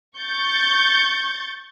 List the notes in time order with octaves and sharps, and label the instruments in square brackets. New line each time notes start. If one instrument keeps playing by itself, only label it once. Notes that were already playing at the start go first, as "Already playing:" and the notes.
[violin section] C#6 G6 A6